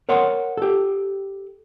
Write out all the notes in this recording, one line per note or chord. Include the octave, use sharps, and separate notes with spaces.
A#4 C#5 F#5 G5 C6
G4 A4